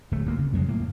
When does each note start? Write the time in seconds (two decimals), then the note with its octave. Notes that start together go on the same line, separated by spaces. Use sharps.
0.11 D1 A3
0.26 D2 A#3
0.38 C#3
0.53 F2 F#3 G#3
0.68 A2 A#3